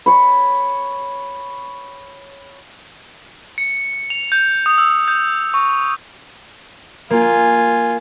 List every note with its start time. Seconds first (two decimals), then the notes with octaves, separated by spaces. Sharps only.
0.06 C#5 B5
3.58 C#7
4.10 F7
4.32 G6
4.66 D#6
4.78 E6
5.08 G6
5.54 C#6
7.10 A#3 F4 G#5